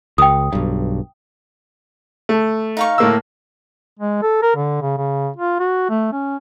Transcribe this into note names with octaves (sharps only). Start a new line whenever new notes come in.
C#2 G5 D#6
B1 G2
A3
D#4 F5 C#6
A2 A#3 E6
G#3
A4
A#4
D3
C#3
C#3
F4
F#4
A3
C#4